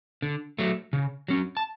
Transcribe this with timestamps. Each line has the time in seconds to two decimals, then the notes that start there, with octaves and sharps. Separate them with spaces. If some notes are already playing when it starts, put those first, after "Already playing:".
0.22 D3
0.59 F#3 A3
0.93 C#3
1.28 F#3 C#4
1.57 A5